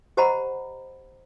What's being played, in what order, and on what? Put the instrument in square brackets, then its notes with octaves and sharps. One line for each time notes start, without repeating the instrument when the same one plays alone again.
[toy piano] G4 C5 D#5 F#5 A#5 B5